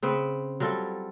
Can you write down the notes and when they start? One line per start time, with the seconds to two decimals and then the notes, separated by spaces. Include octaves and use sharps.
0.03 C#3 C4 B4
0.60 F#3 G3 F4 A4